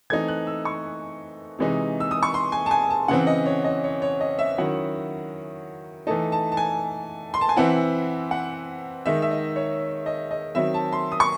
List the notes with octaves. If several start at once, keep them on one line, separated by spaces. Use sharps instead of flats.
E3 A3 C4 D#4 G#6
F#6
E6
C#6
C3 E3 G#3 D#4
E6
D#6
C#6
C6
G#5
A5
G#5
A5
C#3 E3 C4 F#5
D#5
C#5
D#5
C#5
C#5
D#5
E5
D#3 F#3 C#4 E4 F#5
E3 A3 D#4 A5
A5
A5
G#5
C6
A5
G#5
E3 C4 E4 F#5
F#5
D#3 G#3 D#4 E5
E5
D#5
C#5
D#5
D#5
D#3 F#3 C4 E5
A5
C6
D#6
C#6